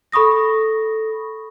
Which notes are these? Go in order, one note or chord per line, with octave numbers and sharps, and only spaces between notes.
A4 B5 C#6 D#6 A#6